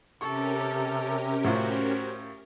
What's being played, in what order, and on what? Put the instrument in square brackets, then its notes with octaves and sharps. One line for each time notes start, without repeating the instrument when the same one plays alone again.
[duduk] C3 [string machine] C#4 G4 A#4 [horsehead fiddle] A4 [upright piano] C#6
[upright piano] A2 F4 [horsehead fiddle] F#4 C5